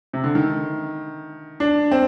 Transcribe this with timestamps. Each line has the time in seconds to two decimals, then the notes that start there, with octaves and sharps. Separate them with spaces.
0.13 C3
0.24 D3
0.35 D#3
1.60 D4
1.91 C4